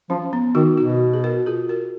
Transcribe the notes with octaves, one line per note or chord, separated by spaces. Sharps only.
F3 C#4
B3
D#3 D#4 F#4
B2 D#4 F#4
G#4
F#4 A#4
F4 G#4
F#4 A#4